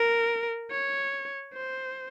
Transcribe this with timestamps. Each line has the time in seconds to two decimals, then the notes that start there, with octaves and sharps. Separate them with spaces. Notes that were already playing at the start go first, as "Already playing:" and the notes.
Already playing: A#4
0.71 C#5
1.54 C5